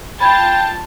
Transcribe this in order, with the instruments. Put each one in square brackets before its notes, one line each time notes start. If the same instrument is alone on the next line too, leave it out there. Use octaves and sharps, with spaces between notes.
[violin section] F4 A5 A6 [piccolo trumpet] G5 [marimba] B5 G#6